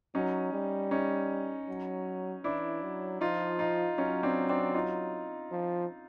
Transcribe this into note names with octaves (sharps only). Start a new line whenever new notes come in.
F#3 C#4 D#4
G3
C#4 D#4
F#3
E3 D4 E4
F#3
F3 D#4 F4
D#4 F4
F#3 C#4 D#4
C4 D4
C4 D4
D#4 F4
F3